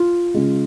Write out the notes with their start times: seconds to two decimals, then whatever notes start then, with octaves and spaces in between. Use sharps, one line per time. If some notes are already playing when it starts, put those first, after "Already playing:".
Already playing: F4
0.34 C#3 G#3